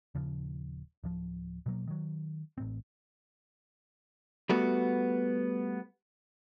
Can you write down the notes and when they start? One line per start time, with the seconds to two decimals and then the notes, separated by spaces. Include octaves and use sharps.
0.15 D#1 C#3 F3
1.04 D1 F3
1.66 B2 F#3 A#3
1.87 D#3 F#3
2.58 A1 A2 C4
4.49 G3 A3 B3 F#4